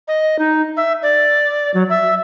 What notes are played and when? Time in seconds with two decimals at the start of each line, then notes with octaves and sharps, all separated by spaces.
0.08 D#5
0.39 D#4
0.77 E5
1.02 D5
1.74 F#3
1.90 E5